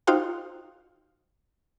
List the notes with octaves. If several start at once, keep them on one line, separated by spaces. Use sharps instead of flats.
D#4 F4 F#4 C5 F5 G5